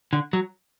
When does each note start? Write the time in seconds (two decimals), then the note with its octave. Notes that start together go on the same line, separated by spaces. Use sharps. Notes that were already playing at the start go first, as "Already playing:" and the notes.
0.13 D3
0.33 F#3